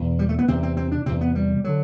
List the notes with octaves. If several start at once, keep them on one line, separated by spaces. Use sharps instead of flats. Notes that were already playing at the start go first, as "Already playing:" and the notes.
Already playing: E2 B2
G3
A3
B3
E2 C3 C4
C4
C4
D4
E2 C3 C4
B3
G3
D3 F#3